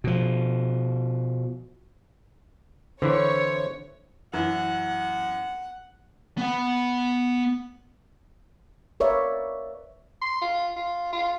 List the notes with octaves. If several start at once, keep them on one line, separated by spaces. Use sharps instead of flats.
B2 F3
D3 E3 E4 C5 C#5
F#2 E3 F#5
B3 F#5
A#4 B4 C#5 D5 E5 F5
C6
F4
F4
F4